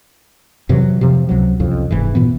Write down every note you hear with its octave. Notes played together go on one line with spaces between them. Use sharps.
F2 C3 E3 F#3
C3 F3 C4
C#2 C3 F#3
C2 F2 C#3
F1 G#2 E3
A1 A#2 E3 B3